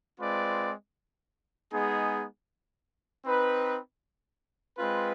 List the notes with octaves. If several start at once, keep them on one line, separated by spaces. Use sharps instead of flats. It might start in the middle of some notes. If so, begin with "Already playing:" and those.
G#3 C4 F4 B4 D5
G#3 B3 D#4 G#4
C4 D#4 B4
G#3 C4 F4 B4